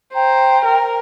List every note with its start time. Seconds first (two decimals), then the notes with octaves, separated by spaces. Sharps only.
0.13 C5 G5 A#5
0.65 A#4